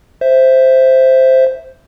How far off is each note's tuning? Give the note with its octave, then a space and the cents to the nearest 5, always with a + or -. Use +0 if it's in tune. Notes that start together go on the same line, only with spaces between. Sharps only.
C5 +0 E5 +0